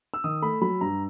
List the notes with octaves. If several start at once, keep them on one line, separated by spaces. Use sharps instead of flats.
E6
D#3 D#6
A3 B5
F#3 B5
G2 A#5